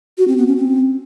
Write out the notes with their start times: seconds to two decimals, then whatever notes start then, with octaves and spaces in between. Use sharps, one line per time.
0.18 F#4
0.28 C4
0.37 B3
0.47 C#4
0.57 C4